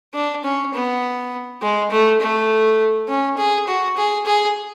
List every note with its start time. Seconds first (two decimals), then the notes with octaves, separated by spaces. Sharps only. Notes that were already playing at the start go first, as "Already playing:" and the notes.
0.14 D4
0.44 C#4
0.74 B3
1.62 G#3
1.91 A3
2.20 A3
3.08 C#4
3.37 G#4
3.67 F#4
3.97 G#4
4.26 G#4